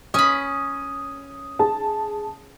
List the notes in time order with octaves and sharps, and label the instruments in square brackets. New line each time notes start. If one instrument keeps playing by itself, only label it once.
[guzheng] C#4 B5 [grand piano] D#6
[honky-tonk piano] G#4 A5